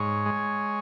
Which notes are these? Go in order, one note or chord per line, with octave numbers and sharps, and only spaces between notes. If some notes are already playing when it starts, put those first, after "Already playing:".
Already playing: G#2 C#5
G#3